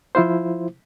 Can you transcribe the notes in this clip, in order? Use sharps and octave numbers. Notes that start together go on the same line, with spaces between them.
F3 E4 F4 C5